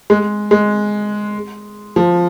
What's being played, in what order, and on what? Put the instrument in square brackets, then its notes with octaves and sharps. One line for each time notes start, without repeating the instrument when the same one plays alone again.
[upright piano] G#3
G#3
F3